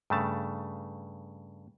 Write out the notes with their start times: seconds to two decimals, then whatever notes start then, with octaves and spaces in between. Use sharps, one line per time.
0.10 G2 C#3 A3 A5